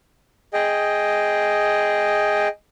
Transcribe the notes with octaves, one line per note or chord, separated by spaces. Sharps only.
G#4 D#5 G5